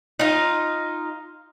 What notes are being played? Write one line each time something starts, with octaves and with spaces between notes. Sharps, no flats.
D#4 F4